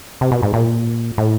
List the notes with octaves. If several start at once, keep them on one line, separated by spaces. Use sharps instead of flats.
C3
B2
G#2
A#2
A2